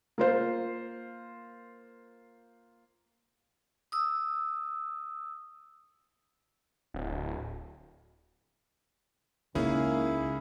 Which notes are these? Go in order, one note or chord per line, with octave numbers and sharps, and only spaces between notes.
A#3 F4 C5
D#6 E6
D1
C#2 A#3 C#4 D#4 E4 G#4